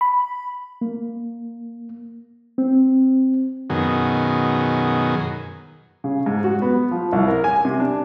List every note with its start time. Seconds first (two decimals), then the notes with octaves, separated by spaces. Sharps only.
0.01 B5
0.81 A#3
2.58 C4
3.70 F#2 B2 D#3 G#4
6.04 C#3
6.26 G#2
6.44 F#4
6.62 B3
6.91 F3
7.13 C2
7.28 A#4
7.44 G#5
7.65 C3
7.80 D4